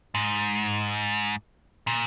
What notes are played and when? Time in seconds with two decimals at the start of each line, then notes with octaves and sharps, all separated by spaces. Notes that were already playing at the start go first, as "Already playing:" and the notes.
0.15 G#2
1.87 A#2